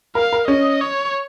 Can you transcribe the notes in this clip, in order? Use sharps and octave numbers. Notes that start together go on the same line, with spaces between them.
A#4 F5
A#4
C#4 D#5
C#5